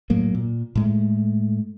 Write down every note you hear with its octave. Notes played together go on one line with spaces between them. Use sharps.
A2 F#3 A#3
A#2
A2 G#3 A3